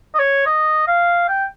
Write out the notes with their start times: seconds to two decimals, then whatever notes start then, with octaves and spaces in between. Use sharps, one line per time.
0.15 D#5
0.20 C#5
0.47 D#5
0.88 F5
1.29 G5